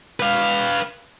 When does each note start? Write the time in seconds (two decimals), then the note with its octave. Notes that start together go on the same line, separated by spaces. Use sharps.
0.20 B4 F5